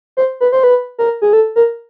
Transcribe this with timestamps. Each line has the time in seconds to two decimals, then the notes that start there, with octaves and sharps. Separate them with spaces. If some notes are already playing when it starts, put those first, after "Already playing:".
0.17 C5
0.41 B4
0.52 C5
0.64 B4
0.98 A#4
1.22 G#4
1.33 A4
1.56 A#4